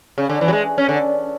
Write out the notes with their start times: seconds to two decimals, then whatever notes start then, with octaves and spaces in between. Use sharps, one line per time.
0.18 C#3
0.29 D3
0.41 E3
0.48 F#3
0.53 G#3
0.78 C#4
0.89 D3